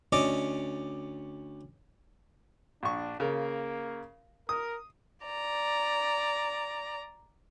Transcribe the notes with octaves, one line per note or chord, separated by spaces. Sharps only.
D2 C#4 D5 D#5
A#1 D4 C#6
C#3 A#3 A#4
A#4 D#6
D5 A#5